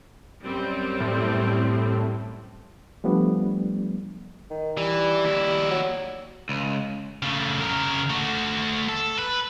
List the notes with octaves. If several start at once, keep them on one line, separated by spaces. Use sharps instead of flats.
F#2 G3 C4
A2
F3 G3 A3 B3 D4
D#3
E3 G3 E4
D#2 E4
F#3
C#2
C#3 A3
C#3 A#4
A3 F#4
A4
B4